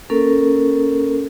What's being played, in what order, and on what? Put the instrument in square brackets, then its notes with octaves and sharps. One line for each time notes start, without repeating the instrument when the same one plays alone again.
[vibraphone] A#3 C#4 A4 A#4